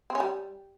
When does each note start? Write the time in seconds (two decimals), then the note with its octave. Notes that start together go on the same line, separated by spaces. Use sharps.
0.10 C4
0.15 C#4
0.20 G3